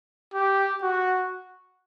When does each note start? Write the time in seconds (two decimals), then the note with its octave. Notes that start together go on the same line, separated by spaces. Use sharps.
0.34 G4
0.82 F#4